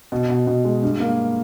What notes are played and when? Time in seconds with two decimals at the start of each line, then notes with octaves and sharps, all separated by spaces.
0.12 B2
0.29 B2
0.47 B2
0.65 G#3
0.83 G2
1.00 A#3